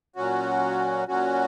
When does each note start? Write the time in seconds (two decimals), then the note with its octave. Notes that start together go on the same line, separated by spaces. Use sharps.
0.16 A#2 F#3 C#4 F#4
1.08 A#2 F#3 C#4 F#4